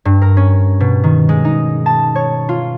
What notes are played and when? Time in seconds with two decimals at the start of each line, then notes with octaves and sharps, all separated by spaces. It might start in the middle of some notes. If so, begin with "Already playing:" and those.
0.05 G2
0.22 A#4
0.37 C#4
0.80 B2
1.04 D#3
1.29 G#3
1.45 D#4
1.86 A5
2.15 C#5
2.49 F4